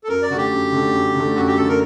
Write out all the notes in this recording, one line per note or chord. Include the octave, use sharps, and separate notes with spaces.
A4
F#2 A#4
D5
D3 A3 F#4 G4
F#2
D3 A3
F#2
D3 A3
F#2 F#4
G4
D3 A3 A4
A#4